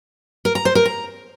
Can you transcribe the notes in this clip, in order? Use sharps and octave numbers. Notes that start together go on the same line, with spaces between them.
A#4
A#5
C5
A#4
A#5